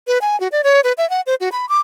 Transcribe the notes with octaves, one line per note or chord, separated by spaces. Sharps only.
B4
G#5
F#4
D5
C#5
B4
E5
F#5
C5
F#4
B5
D6